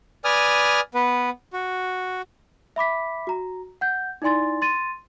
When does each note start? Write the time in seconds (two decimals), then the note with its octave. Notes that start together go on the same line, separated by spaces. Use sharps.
0.24 B4 D5 G#5 D#6 F6
0.94 B3 B4
1.53 F#4
2.76 E5 B5 D6 B6
3.27 F#4 A#5
3.81 F#5 G6
4.22 D#4 E4 D5 G#5 C6 A6
4.62 C6 A6 D#7